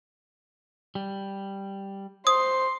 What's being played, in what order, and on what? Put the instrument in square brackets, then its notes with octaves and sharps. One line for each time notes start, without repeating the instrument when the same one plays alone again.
[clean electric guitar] G3
[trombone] C5 [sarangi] C6 [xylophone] D#6